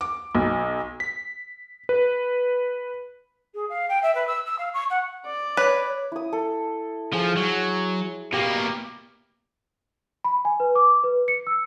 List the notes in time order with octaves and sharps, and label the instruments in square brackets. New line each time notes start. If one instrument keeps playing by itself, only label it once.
[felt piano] D6
B1
[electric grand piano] B6
B4
[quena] G#4
F5
G5
E5
B4
E6
E6
F5
C#6
F#5
[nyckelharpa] D5
[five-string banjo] B4 [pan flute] C#5
[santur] E4 D#6
A4
[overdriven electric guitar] F3 [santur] G#4 C6
[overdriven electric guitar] F#3
[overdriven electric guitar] B2 A#3 [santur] G4 G5
[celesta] B5
G#5
B4
D6
B4
C#7
E6